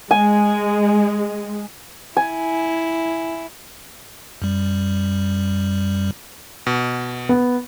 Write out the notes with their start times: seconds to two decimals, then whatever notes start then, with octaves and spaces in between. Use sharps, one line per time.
0.11 G#3 G#5
2.17 E4 G#5
4.42 F#2 G3
6.67 B2
7.29 B3